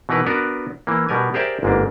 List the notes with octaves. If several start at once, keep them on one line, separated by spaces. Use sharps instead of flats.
B2 E3 D#4 A#4 B4
B3 D4 F#4 A#4 B4
E3 A#3
B2 G3 B3 A#4 G#5
G4 G#4 A#4 C5 D5 E5
G1 G#2 A#3 D4